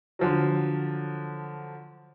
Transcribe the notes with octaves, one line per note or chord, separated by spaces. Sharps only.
D3 F3 F#3